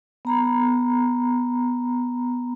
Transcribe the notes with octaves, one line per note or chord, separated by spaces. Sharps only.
B3 A#5 B5